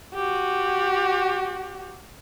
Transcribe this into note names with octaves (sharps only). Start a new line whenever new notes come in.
F#4 G4